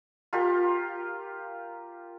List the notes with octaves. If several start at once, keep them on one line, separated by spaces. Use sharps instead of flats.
F4 G4 A#4